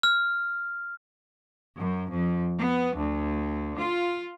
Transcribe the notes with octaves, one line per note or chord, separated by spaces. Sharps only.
F6
F#2
F2
B3
D2
F4